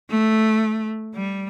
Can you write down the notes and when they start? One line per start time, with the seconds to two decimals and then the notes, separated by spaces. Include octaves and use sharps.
0.11 A3
1.15 G3